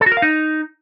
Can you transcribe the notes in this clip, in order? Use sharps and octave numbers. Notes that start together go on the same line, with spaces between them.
A4
F#4
A#4
F5
D#4